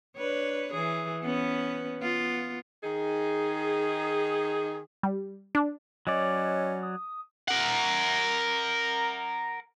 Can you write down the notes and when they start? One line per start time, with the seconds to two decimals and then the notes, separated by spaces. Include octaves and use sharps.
0.17 D4 B4 C#5
0.73 E3 G#4
1.23 B3 C#4 B4
2.00 B3 F4
2.83 D#3 D#4 G#4
5.03 G3
5.55 D4
6.07 F#3 C#4 D5 D#5
6.83 D#6
7.48 A#4 F#5